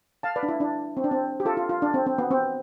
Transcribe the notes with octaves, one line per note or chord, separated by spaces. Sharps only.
F5 A5
B4 D5
D4
E4
D4
C4
D4
C4
G4
F4 A4
F4
F4
D4
C4
C4
B3
C4